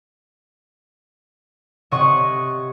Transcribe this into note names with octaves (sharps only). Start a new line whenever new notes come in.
C3 C#5 D#5 F#5 C#6